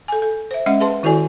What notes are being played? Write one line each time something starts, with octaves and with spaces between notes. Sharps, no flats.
A4 G#5
A4
C5 E5
G#3 C#4 D#5 E5 F#5
G#4 B4 A5 C6
D#3 E4 F#4 A4 D5 G#5